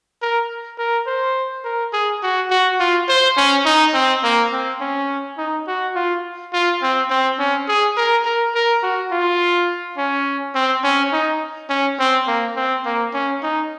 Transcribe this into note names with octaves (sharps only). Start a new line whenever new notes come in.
A#4
A#4
C5
A#4
G#4
F#4
F#4
F4
C5
C#4
D#4
C4
A#3
C4
C#4
D#4
F#4
F4
F4
C4
C4
C#4
G#4
A#4
A#4
A#4
F#4
F4
C#4
C4
C#4
D#4
C#4
C4
A#3
C4
A#3
C#4
D#4